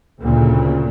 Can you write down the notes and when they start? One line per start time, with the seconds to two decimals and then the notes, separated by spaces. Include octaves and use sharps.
0.21 D2 A#2 C#3